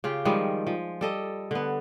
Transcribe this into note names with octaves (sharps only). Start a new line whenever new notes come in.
C#3 F4 G4
D#3 F3 G3 G#3
F3
G3 A4 D#5
D3 B3